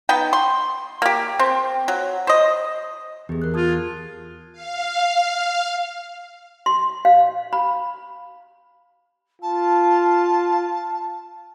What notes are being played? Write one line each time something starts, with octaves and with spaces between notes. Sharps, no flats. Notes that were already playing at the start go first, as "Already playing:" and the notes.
B3 D#4 G5
C6
A#3 G4
C4
F#3
C5 D#5
E2 G4 G#4
A#4 F#6
F4 A5 D#6 G#6
G#6
F5
C6
F5
B5
F4 A5